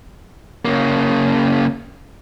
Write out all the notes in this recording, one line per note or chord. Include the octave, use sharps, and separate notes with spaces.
C#3 A#3